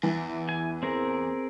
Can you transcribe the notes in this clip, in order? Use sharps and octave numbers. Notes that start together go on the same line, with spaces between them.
E2 E3
G#5
C4 G#4 A#4